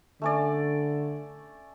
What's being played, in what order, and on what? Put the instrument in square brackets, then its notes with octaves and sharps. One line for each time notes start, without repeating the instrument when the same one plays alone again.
[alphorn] D3 [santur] A3 C#4 D5